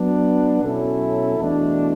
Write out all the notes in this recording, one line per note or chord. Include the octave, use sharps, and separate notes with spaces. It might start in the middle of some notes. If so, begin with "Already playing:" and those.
Already playing: F#3 B3 D4
B2 F#3 C#4 E4 A4
E2 B2 A3 D4